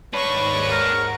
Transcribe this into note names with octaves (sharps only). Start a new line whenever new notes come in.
D#2 G#2 D4 B4 C#5 C#6 D7
A#4 F#5